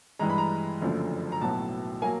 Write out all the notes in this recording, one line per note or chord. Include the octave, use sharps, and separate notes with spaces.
G2 E3 G#3 A#5
B5
A#5
F#1 F#2 D3 F3 A3
A#5
B1 A2 F#3 B3 A5
F#3 A#3 G#5